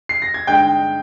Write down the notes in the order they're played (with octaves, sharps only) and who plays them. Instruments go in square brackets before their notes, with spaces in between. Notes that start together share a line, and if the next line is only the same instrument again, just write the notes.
[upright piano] C7
A#6
G#6
G2 D3 G#3 D#4 G5 G6